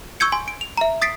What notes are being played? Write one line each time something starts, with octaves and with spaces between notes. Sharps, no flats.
C#6 E6 G6 G#6 C#7
G#5 C6
D7
F7
E5 A#5
D#6 A6 B6 C7 D7